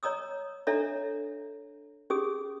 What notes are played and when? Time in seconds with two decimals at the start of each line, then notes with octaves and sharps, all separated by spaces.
0.03 C#5 D#5 A#5 D#6 E6
0.67 D4 A4 C#5 D#5 E5 A#5
2.10 C#4 G4 G#4 D#6